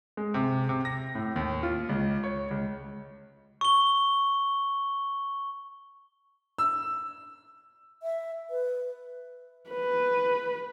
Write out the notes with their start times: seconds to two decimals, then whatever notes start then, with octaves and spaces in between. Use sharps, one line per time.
0.17 G#3
0.34 C3
0.69 C3
0.85 A#6
1.15 A2
1.36 D#2
1.63 F4
1.89 C#2
2.24 C#5
2.51 C#2
3.61 C#6 G7
6.58 E6
8.03 E5
8.50 B4
9.69 B4